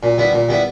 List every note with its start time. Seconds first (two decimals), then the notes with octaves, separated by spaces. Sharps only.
0.03 A#2
0.18 G3 B3 E4
0.33 A#2
0.49 G3 B3 E4